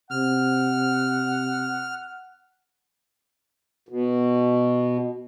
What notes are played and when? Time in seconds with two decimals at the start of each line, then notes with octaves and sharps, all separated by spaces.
0.11 C3 F#5 F6
3.89 B2